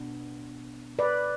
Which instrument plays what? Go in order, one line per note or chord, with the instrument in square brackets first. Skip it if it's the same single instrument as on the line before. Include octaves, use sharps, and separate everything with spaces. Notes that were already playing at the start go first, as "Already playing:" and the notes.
Already playing: [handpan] B2 B3 D4
B4 D5